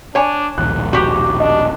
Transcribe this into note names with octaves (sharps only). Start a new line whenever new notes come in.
D4 C#5 G#5
A#1 D#2 G#2 B2 F#6
F#4 G4
D4 D#5